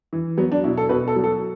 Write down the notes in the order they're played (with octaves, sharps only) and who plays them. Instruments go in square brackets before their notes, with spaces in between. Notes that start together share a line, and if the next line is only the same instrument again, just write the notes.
[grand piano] E3
F#3 B3
D4
B2 E4
A4
B2 B4
A4
F#3
A4